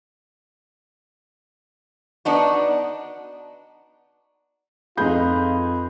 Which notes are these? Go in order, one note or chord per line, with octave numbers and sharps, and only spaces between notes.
B3 D4 D#4 F#4
F2 D#4 F4 G#4 B4 G6